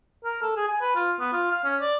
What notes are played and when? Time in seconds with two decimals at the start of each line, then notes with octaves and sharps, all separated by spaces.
0.24 A#4
0.42 A4
0.56 G#4
0.68 G#5
0.81 B4
0.95 F4
1.20 B3
1.33 F4
1.51 F5
1.64 C#4
1.81 D5